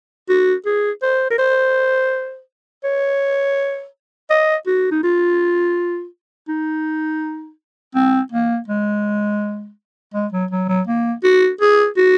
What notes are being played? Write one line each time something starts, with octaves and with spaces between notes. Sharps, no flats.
F#4
G#4
C5
A#4
C5
C#5
D#5
F#4
D#4
F4
D#4
C4
A#3
G#3
G#3
F#3
F#3
F#3
A#3
F#4
G#4
F#4